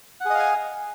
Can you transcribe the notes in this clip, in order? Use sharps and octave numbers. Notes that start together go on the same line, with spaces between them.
G#4 D#5 F5 F#5 G#5